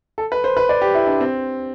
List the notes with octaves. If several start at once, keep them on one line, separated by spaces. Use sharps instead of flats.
A4
B4
C5
B4
D5
G4
E4
D4
C4